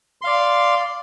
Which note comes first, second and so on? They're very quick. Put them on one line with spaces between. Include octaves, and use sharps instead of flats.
C6 F5 D5